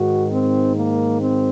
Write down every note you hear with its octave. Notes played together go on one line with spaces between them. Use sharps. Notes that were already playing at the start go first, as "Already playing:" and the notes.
Already playing: G#2 D#3 F#4
C4
A#3
C4